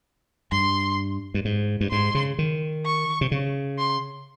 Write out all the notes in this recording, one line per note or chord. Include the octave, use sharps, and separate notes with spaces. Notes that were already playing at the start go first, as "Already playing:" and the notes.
G2 C6
G2
G#2
G2
G#2 C6
C#3
D#3
C#6
C3
C#3
C6